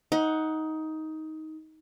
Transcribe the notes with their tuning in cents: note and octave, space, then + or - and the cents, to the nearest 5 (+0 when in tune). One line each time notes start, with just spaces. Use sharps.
D#4 +15 F#5 +0